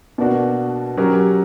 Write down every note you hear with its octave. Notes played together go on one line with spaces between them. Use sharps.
B2 A#3 D4 F#4
F#3 C#4 G4 A#4